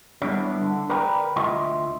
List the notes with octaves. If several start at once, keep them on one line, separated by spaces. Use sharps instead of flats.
G3 B3 D4 E4 C#5
D3
A#4 B4 D5 G5 A#5 B5
D2 F4 D#5 E5 C6